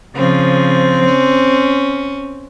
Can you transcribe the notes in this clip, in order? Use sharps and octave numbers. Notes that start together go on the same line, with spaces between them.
C#3 F3 C4
C#4